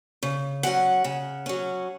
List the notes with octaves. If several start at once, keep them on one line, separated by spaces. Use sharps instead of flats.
C#3
F#3 C#4 F#5
C#3
F#3 C#4